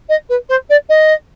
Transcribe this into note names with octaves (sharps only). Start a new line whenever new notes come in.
D#5
B4
C5
D5
D#5